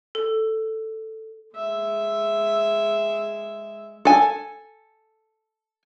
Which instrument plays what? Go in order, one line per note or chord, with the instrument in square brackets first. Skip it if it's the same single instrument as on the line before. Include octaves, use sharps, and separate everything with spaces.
[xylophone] A4
[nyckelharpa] G#3 E5
[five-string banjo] A4 G#5